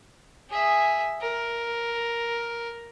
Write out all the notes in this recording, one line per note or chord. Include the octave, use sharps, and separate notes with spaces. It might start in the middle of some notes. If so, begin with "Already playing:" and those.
G#4 E5
A#4